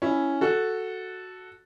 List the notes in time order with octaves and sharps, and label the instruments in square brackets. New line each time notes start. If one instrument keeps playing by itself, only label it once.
[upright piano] C#4 E4
F#4 A4